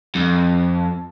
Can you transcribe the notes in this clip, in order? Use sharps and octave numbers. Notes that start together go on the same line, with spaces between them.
F2